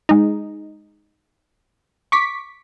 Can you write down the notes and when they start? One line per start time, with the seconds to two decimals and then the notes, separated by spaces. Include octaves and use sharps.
0.09 G#3 D#4
2.12 C#6 D6 B6